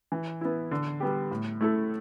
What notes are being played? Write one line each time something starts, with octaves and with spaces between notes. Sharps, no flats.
E3
B3 E4
D3
G3 B3 G4
A2
A3 E4 A4